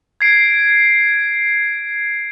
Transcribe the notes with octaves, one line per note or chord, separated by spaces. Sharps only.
G#6 C7 D7